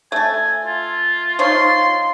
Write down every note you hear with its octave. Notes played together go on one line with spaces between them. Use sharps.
A3 A4 G#5
F4
F3 D#4 C#5 C6